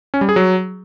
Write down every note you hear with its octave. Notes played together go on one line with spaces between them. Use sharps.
C#4
G3
G#4
F#3